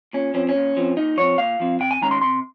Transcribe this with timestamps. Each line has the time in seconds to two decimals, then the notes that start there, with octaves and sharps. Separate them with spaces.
0.13 A#2 C#4
0.34 F3 C4 C#4
0.49 C#4
0.56 A#2
0.77 F3 C4
0.97 A#2 D#4
1.17 F3 C4 C#5
1.38 A#2 F5
1.60 F3 C4
1.80 C3 G5
1.91 G#5
2.01 D#3 G#3 C#4 A#5
2.11 C6
2.22 C3 C6